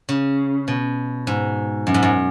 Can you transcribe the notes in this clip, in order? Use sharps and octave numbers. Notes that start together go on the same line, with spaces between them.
C#3
B2
G#2
F#2
G#2
F#2